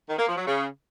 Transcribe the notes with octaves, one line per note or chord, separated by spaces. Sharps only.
D#3
A#3
F3
F#3
C#3